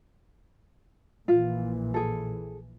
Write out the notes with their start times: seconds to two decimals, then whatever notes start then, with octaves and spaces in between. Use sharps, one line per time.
1.28 A#1 A#2 E3 F4
1.94 G#4 A4